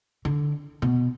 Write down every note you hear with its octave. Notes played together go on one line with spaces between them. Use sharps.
D3
B2